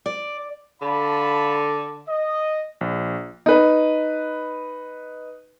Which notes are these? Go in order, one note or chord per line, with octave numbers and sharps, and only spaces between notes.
D5
D3 F5 A5 B5
D#5
A#1
D#4 B4